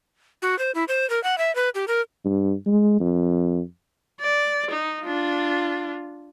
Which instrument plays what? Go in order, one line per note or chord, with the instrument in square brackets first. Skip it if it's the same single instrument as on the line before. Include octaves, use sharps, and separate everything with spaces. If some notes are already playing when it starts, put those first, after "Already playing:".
[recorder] F#4
C5
E4
C5
A#4
F#5
E5
B4
G4
A#4
[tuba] G2
G#3
F2
[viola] D5
D#4
D4 F4